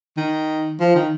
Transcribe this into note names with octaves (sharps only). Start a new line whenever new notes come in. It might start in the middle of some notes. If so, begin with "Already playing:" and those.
D#3
F3
D#3